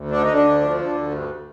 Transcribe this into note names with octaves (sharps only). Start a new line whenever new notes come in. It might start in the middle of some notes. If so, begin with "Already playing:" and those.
Already playing: D2
D3 D4
D#4
D3
D4
D2
F3
D3
D2
G2